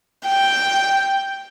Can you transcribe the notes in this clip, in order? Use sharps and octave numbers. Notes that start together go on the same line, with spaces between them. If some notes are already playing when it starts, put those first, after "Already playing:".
G5